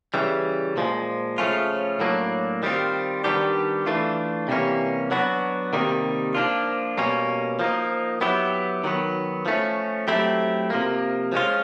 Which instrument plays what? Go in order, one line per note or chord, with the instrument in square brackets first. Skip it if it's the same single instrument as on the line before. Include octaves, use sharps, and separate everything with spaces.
[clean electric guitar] C#3 E3 G3
A#2 F3 G#3
C#3 F3 A3 C#4 F4
A2 F#3 A#3 D4
D#3 G3 C4 F4
D#3 G3 B3 D4 G4
E3 A3 D4 F4
C3 E3 G3 A#3 C#4
F#3 B3 D4 F#4
C3 D#3 G3 A#3 D#4
F3 A#3 D4 F4
B2 G3 A#3 C#4
F3 A#3 D#4
F#3 B3 E4 G4
D#3 F#3 B3
F3 A3 C#4
F#3 A3 C4 E4 G4
C3 F3 A#3
F3 G#3 C#4 F4